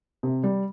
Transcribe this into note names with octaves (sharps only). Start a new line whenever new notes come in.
C3
G3